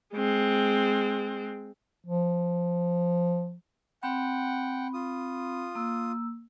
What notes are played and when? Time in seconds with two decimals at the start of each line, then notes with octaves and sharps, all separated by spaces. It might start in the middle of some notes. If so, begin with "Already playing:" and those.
0.14 G#3 C4
2.06 F3
4.03 C4 F#5 G5 B5
4.94 F4 D#6
5.75 A#3 E6